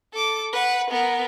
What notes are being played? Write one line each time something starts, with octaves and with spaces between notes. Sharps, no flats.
A4 D6
B4 F#5
B3 A#4